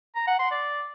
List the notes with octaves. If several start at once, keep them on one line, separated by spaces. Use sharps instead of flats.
A#5
F#5
C6
D5